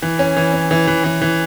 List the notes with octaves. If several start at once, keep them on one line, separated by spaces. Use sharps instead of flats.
E3
C#4
E3
C#4
E3
E3
E3
E3